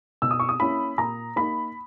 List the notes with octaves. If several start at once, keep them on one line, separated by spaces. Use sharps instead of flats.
B2 E6
D#6
C#6
D#6
A#3 C#4 E4 B5
A#2 A#5
A#3 D#4 B5